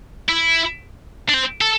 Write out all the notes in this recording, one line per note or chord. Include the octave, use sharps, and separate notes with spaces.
E4
D4
C4
A4